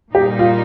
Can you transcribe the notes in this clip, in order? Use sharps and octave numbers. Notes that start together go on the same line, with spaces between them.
A#2 G3 A#3 D#4 G4
F4